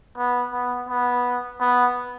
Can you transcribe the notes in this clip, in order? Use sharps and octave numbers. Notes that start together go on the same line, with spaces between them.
B3
B3
B3
B3